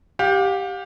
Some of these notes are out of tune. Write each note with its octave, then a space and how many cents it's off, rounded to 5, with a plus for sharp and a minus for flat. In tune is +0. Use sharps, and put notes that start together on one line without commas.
G4 +0 F5 +40